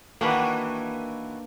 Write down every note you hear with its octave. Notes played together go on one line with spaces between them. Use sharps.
D#3 E3 A#3 D4 F#4 B4